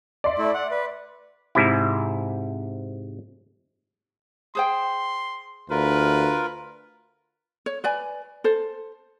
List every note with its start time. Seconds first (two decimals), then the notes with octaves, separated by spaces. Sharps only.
0.24 D5 E5 C6
0.38 A3 E4
0.54 F#5
0.71 B4
1.55 G#2 C3 E4
4.55 G#4 C5 G5 C6
5.70 D2 F4 A#4 B4
7.66 C#5
7.84 B4 D5 G#5
8.44 A4 C5